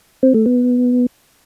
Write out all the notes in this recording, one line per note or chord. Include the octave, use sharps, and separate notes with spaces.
C4
A3
B3